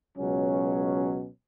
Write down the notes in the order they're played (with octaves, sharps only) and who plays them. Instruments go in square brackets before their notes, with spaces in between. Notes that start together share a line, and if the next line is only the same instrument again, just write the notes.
[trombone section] C#2 B2 F#3 C#4